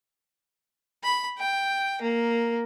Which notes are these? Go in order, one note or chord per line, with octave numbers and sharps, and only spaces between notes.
B5
G5
A#3